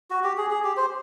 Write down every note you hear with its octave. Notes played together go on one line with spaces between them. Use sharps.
F#4
G4
G#4
G#4
G4
C5